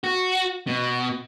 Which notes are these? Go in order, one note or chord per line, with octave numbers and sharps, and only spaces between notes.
F#4
B2